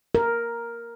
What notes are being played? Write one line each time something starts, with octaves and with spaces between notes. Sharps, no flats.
A#4